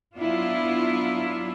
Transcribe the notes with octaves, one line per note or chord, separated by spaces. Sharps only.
F#3 B3 D4 E4 F4